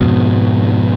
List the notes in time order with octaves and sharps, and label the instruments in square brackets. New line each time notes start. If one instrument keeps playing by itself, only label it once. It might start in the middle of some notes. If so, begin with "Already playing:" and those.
[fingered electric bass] F2 G#2 B2